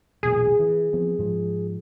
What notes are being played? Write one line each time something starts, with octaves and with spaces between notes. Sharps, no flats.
E1 B1 A#2 G#4
E3
F3 B3 C4
G#2 F3